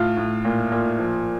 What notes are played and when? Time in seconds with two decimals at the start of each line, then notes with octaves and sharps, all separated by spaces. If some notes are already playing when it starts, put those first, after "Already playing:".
Already playing: A2 F4
0.17 A2
0.45 A#2
0.72 A#2
0.99 F3